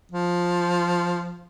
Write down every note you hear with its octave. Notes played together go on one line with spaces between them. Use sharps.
F3